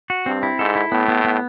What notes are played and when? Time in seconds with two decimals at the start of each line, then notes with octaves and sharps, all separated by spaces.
0.10 F#4
0.26 G2 C4
0.43 E4
0.59 G#2 A4
0.75 E4
0.92 A2 B3
1.08 B3
1.25 B3